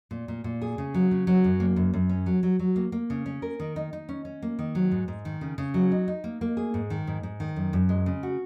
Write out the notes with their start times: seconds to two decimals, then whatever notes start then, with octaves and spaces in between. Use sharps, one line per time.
0.11 A#2
0.28 A#2
0.44 A#2
0.62 G#4
0.78 C#3
0.94 F#3
1.11 C#3
1.27 F#3
1.44 F#2
1.60 A#3
1.76 F#2
1.94 F#2
2.09 C#4
2.26 F#3
2.43 F#3
2.59 F#3
2.76 A#3
2.92 A#3
3.10 C#3
3.26 C#4
3.42 A#4
3.60 D#3
3.76 D#4
3.93 D#4
4.09 C#4
4.25 C#4
4.42 A#3
4.59 D#3
4.75 F#3
4.91 G#2
5.08 G#2
5.25 D#3
5.41 C#3
5.58 C#3
5.74 F#3
5.91 D#4
6.08 D#4
6.24 A#3
6.41 A#3
6.57 G#4
6.74 G#2
6.90 D#3
7.07 G#2
7.23 G#2
7.40 D#3
7.56 F#2
7.73 F#2
7.89 G#3
8.06 C#3
8.23 F#4